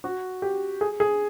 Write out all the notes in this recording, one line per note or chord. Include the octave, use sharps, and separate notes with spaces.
F#4
G4
G#4
G#4